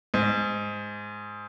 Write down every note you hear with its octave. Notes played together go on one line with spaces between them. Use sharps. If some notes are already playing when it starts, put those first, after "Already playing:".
G#2